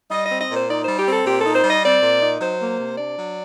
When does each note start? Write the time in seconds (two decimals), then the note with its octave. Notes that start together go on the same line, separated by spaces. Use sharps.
0.10 G3 D#5
0.25 D#5
0.30 C4
0.39 D#5
0.49 A#2 C5
0.68 D#4 D5
0.82 G3 C5
0.97 G4
1.06 C4 A4
1.25 A#2 G4
1.39 D#4 A4
1.54 C5
1.63 G3 D#5
1.83 C4 D5
2.01 A#2
2.21 D#4
2.40 F#3 C5
2.59 A#3
2.78 C3
2.97 D4 D5
3.16 F#3